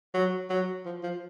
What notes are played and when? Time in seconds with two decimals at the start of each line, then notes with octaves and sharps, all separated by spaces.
0.14 F#3
0.50 F#3
0.85 F3
1.03 F3